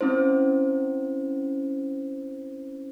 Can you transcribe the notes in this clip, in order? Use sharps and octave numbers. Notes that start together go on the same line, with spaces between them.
C4 C#4 E4 C5